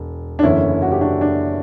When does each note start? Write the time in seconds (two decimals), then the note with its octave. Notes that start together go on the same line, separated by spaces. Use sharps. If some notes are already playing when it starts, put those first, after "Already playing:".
Already playing: E1
0.39 D4
0.43 F#1 E2 D3 C#4 E4
0.82 F#4
0.92 G4
1.01 D4 F#4
1.21 D4